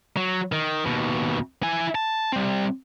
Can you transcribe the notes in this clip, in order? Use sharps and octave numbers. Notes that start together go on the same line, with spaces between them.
F#3
D#3
D#2 B2
E4 G#5
A5
G3 C4